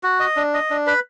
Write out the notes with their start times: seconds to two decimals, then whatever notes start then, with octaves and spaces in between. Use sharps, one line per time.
0.03 F#4
0.20 D#5
0.36 D4
0.54 D#5
0.70 D4
0.86 B4